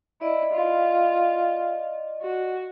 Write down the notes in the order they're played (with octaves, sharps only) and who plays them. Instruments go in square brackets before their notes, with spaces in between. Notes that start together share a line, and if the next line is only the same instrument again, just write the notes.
[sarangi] E4 [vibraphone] D5 D#5
[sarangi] F4
F#4